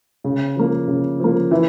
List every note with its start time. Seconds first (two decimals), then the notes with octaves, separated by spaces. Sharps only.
0.24 C#3
0.56 F3 A#3
0.88 C#3
1.20 F3 A#3
1.51 E3